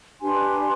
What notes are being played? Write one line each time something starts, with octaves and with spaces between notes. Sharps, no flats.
D4 G4 B4 G#5 C6